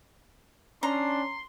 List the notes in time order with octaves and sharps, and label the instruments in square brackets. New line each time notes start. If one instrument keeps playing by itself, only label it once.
[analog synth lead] C#4 [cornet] D4 [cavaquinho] A#5 [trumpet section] C6